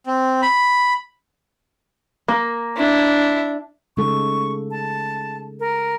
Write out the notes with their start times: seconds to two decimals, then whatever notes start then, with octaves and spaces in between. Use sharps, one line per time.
0.06 C4
0.42 B5
2.28 A#3
2.77 D4 E4
3.97 C#3 G#3 A4 C#6
4.71 A5
5.60 A#4